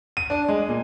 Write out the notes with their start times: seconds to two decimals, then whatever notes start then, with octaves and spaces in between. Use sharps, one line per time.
0.17 D#7
0.30 D4
0.48 G#3
0.69 A#2